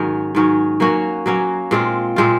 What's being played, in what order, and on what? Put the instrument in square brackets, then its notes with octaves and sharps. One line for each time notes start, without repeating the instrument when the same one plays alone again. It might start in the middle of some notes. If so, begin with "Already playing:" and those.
Already playing: [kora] G#2 D#3 F#3 C#4
G#2 D#3 F#3 C#4
F#3 A#3 C#4 F#4
F#3 A#3 C#4 F#4
A#2 G#3 C4 F4
A#2 G#3 C4 F4